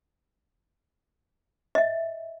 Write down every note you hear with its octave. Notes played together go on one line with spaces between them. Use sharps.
D#5 E5